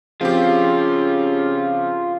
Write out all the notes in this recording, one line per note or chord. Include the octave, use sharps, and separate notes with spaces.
C#3 F3 C4 F4 G4